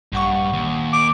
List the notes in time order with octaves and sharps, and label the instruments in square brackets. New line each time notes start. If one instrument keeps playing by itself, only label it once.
[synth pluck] A#1 F#5 C#6 [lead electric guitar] G2
[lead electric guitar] D#2
[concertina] D6